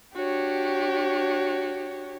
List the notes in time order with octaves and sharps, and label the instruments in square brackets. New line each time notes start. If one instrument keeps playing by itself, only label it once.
[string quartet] D4 F#4 G4 C#5